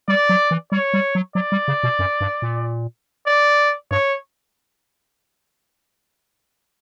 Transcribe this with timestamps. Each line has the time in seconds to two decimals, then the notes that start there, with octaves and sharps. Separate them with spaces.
0.08 G3 D5
0.29 F#3
0.51 E3
0.72 G3 C#5
0.94 G3
1.15 F#3
1.35 F#3 D5
1.52 G3
1.68 C#3
1.83 B2
1.99 F#2
2.21 G2
2.42 A#2
3.27 D5
3.91 G2 C#5